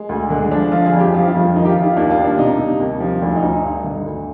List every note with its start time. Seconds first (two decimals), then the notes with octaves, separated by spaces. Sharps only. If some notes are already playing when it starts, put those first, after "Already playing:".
Already playing: G#3
0.09 D2
0.30 D3 G#3
0.51 F3 D4
0.72 F3 F4
0.86 G#4
0.93 F2
1.00 G4
1.14 F3 F4
1.28 F4
1.34 F2
1.56 D#3 D#4
1.65 G4
1.70 F4
1.76 D#3
1.83 F4
1.96 D#2 D4
2.10 F4
2.17 D#2
2.24 D4
2.38 C3 D#4
2.59 C3
2.80 D#2
3.00 F3
3.22 D2 D4
3.36 D#4
3.42 D2
3.50 D#4
3.64 G2
3.84 D3
4.05 D2